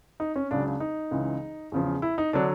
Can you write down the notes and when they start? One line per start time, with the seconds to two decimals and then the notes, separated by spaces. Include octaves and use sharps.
0.20 D#4
0.36 C#4
0.51 C#2 C#3 F#3 D4
0.66 D4
0.80 D#4
1.11 C#2 C#3 E3
1.72 E2 C#3 F3
2.02 E4
2.18 D#4
2.33 D3 F#3 D4